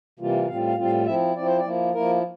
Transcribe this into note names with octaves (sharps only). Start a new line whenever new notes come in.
C3 E3 G3 A#3 F4
A2 G3 C4 F4 F5
F5
A2 G3 C4 F4
F5
F3 C4 E4 E5
F3 C4 E4 D5
C5
D5
F3 A#3 E4
F3 A#3 E4 A#4